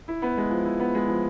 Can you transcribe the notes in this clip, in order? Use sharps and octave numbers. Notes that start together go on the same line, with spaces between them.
E4
B3
G#3
F3
E4
B3
G#3
F3